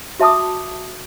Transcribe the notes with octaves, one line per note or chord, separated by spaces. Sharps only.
F#4 E5 A5 D6 D#6